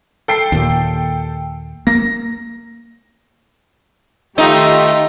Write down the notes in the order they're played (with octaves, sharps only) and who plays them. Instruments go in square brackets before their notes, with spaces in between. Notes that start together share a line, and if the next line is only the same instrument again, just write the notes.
[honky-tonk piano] A4 G5 C7
[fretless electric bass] D#2 A#2
[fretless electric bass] A#3 [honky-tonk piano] A#6
[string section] D#3 F4 G4 [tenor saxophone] A3 [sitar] D#4